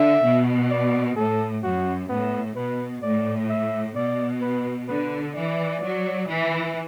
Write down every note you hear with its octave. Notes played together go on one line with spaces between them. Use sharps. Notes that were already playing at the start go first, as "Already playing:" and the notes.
Already playing: D3 E5
B2
D5
A2 A4
F#2 F#4
A2 B3
B2 B4
A2 D5
E5
B2 D5
B4
D3 B4
E3 D5
F#3
E3